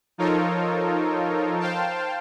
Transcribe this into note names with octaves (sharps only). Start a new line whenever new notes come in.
F3 D#4 F4 A4 A#4 C#5
C5 F5 G5 A5